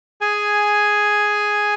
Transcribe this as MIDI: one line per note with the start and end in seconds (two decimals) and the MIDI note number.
0.21 1.75 68
0.21 1.75 80